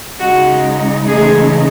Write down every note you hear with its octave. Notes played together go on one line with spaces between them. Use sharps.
C#3 G#3 D#4 F#4
C#3 E3 G#3 A3 D#4 G#4